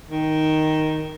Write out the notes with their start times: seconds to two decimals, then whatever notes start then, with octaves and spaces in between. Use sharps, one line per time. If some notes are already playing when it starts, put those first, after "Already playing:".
0.09 D#3